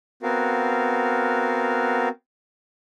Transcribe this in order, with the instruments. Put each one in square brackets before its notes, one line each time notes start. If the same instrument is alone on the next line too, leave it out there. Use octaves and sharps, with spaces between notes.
[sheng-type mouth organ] B3 C4 F#4 A#4 F5